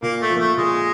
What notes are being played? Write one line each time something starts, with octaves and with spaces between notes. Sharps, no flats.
A#2 A#3
A3
F3
A3 A#3
A#2 G#3